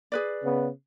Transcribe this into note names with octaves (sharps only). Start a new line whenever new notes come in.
G#4 B4 D5
C#3 B3